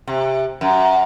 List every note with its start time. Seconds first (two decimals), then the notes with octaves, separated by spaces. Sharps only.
0.07 C3
0.61 F#2